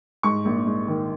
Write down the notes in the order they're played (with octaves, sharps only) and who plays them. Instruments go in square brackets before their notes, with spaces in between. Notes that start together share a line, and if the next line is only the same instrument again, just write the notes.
[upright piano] G#2 C#6
A#1
G#2
D#3